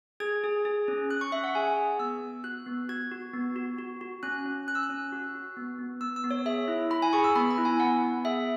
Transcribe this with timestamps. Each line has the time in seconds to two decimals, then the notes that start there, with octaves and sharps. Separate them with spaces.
0.20 G#4 G#6
0.44 G#4
0.65 G#4
0.88 C#4
1.10 C#4 F#6
1.21 C#6
1.32 C#4 E5
1.44 F#5
1.55 G#4 G#5
1.77 G#4
1.99 B3 E6
2.21 B3
2.44 F#4 F#6
2.66 B3
2.89 F#4 G#6
3.12 F#4
3.34 B3
3.56 F#4
3.79 F#4
4.01 F#4
4.23 C#4 F#6
4.46 C#4
4.67 C#4 F#6
4.75 E6
4.83 F#6
4.90 C#4
5.12 F#4
5.35 F#4
5.57 B3
5.78 B3
6.01 B3 E6
6.16 E6
6.24 B3
6.31 C#5
6.45 G#4 E5
6.68 E4
6.90 E4 B5
7.02 G#5
7.13 G#4 C#6
7.24 E6
7.35 B3 B5
7.51 B5
7.58 E4
7.65 G#5
7.79 B3 F#5
8.03 B3
8.25 G#4 E5